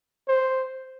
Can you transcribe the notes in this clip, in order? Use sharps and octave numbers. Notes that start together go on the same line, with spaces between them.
C5